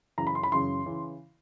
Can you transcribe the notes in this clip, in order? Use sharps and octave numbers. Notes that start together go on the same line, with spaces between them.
F#2 C#3 E3 A#5
B5
C6
B5
F#2 C#3 E3 C6
C#3 E3